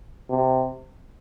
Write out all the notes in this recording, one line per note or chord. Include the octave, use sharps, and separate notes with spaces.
C3